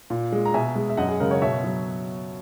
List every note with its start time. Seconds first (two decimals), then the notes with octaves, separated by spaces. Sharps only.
0.10 A#2
0.32 G#3
0.45 A#5
0.54 B2 E5 G#5
0.76 G#3
0.89 E5
0.97 F#2 D#5 F#5
1.08 G#4
1.20 C#3 G#3 A#4
1.31 A#4 C#5
1.42 B2 C#5 E5
1.64 F#3